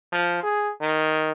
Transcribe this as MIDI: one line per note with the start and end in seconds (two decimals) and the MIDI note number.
0.12 0.38 53
0.43 0.71 68
0.81 1.32 51